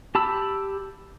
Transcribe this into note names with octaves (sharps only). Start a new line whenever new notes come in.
G4 A5 B5 E6